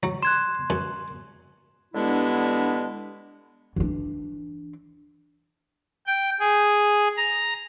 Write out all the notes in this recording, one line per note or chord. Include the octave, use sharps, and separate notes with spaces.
F#3
C6 F#6 G#6 E7
F#2
G2 D3 G#3 B3 D4 E4
E3 D4
G5
G#4
A#5